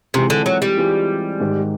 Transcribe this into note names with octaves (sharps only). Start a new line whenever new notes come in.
C3 E3 G#3 C4 F4 G#4
D3
F#3
G3
E3 G#3 C4 F4 G#4
G#2 D#3 G#3